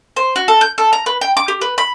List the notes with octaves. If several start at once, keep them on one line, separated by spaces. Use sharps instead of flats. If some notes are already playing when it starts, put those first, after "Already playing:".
C5
F#4
A4
G6
A4
A#5
B4
G5
D6
G4
B4
B5